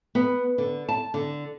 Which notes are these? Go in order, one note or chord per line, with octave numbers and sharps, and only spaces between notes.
B3
D3
A5
D3